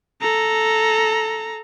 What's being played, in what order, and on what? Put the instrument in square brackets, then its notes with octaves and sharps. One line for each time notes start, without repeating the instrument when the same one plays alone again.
[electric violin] A4 A#5